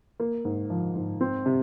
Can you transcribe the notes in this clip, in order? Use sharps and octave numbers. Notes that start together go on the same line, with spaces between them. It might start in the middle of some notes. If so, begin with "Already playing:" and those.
A#3
G#2
F3
G#2
C4
C3